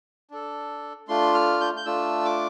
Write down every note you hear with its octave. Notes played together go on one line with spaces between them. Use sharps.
D4 A4
A3 D4 F4 C6
F6
G6
G6
A3 D4 F4 E6
D6